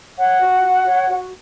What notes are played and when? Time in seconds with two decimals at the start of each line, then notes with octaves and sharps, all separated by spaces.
0.17 C#5 F#5
0.39 F#4
0.62 F#4
0.85 C#5
1.08 F#4